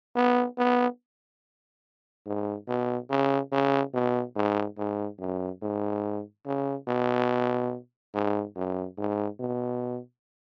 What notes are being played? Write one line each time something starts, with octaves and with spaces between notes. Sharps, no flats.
B3
B3
G#2
B2
C#3
C#3
B2
G#2
G#2
F#2
G#2
C#3
B2
G#2
F#2
G#2
B2